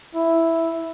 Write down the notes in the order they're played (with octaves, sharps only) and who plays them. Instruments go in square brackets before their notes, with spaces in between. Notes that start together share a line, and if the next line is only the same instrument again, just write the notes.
[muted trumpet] E4